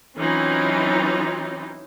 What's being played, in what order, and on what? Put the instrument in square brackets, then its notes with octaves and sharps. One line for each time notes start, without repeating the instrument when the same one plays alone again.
[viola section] E3 F#3 C4 C#4 D#4 F4